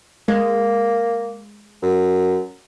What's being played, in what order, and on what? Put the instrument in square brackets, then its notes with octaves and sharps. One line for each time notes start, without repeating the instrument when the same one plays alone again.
[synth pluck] G#3 [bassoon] A#3
[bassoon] F#2